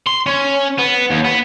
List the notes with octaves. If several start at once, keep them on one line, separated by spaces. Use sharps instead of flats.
C6
C#4
B3
D#2
B3